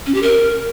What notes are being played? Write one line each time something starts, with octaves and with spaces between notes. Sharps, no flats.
C#4
G4
A#4